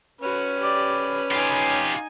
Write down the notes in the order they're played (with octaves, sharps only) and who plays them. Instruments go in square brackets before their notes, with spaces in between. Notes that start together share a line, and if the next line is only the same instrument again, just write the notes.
[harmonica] C#4 B4 B5 [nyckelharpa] F#4
[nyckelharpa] G4 D5
[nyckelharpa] D#4 G#5 [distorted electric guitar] F4 G4